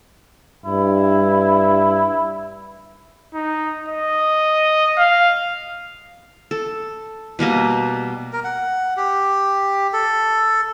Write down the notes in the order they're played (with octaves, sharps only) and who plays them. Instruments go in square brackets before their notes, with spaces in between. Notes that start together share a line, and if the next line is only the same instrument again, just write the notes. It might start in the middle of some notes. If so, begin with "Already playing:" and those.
[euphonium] G2 [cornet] E4
[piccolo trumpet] D#4
D#5
F5
[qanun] A4
B2 G3 A#3 D#5
[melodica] A#4
F#5
G4
A4